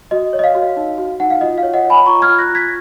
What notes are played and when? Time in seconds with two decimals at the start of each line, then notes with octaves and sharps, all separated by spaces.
0.11 F#4 D#5
0.33 C#5
0.39 D#5
0.44 F5
0.55 F#4
0.77 D#4
0.98 F#4
1.20 D#4 F#5
1.30 F5
1.41 F4 D#5
1.58 F5
1.63 C#5
1.74 D#5 F#5
1.85 C#5
1.90 G#5 B5
2.06 F4 A#5 C#6
2.22 F6 G#6
2.28 F4
2.38 F#6 A#6
2.50 F4
2.55 G#6 B6